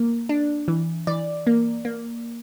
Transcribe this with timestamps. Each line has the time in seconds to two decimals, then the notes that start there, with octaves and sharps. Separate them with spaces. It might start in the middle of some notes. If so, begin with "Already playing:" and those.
Already playing: A#3
0.29 D4
0.68 E3
1.07 E3 D5
1.47 A#3
1.85 A#3